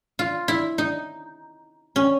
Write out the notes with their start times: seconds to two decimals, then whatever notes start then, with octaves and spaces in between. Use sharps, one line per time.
0.19 F4
0.48 E4
0.78 D#4
1.96 C#4